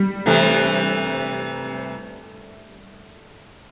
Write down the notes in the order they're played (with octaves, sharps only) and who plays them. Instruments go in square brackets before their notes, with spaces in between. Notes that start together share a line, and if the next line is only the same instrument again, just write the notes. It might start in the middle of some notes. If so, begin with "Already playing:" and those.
Already playing: [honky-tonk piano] G3
[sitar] C3 E3 [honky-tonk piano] A3